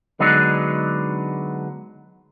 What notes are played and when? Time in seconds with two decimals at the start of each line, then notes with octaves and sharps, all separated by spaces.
0.20 D3 F#3 G#3 B3 D4 D#4